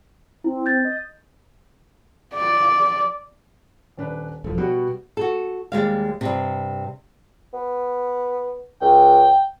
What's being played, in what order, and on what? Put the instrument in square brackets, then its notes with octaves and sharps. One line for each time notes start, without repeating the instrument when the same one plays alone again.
[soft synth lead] C4 [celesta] E4
[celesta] G6 A6
[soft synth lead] D#5
[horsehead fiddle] D5
[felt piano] D#1 D4 B4
[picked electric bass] E1 [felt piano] F3 A4
[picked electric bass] B2 [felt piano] G3 F#4
[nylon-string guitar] F#4 A4
D#2 G3 G#3 F5
G2 C3
[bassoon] B3
[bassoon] C#2 [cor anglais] G5